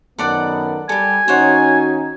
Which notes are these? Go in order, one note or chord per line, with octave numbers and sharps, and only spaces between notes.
F#2 D#3 B3 A4 D5 F#5
G3 G4 A4 G#5
D#3 C#4 D#4 F#4 C5 C#5 F#5